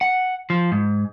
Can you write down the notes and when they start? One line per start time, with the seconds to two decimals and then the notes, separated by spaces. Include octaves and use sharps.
0.01 F#5
0.50 F3
0.72 G#2